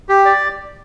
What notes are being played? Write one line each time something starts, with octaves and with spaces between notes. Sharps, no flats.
G4
D5